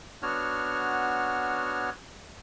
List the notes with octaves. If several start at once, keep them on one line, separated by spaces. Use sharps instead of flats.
B3 D4 F#4 C#5 F6